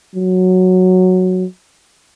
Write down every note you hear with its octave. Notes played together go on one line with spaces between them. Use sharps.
F#3